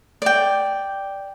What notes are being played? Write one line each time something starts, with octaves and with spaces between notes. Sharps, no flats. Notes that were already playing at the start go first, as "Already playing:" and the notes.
D5 G5